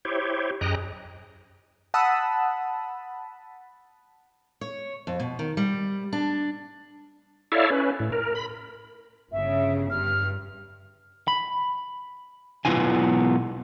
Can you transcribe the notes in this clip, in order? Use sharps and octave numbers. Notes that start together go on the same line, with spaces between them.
E4 G4 C5 C#5
F#2 G#4 D#5 G5 A#5 F#6
F#5 A5 B5 D#6 E6
C#5
F2
B2
D#3
G3
D4
E4 A4 C#5 D5 E5 F5
C#4 B4
A2
A#4
B5
G1 C#3 E5
G2 F6
B5
B1 F#3 B3 E4 F4 G#5